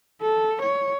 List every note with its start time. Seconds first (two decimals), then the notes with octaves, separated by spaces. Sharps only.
0.22 A4
0.62 C#5